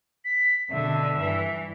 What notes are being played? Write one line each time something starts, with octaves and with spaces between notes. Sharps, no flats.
B6
B2 D3 E5
G2 E3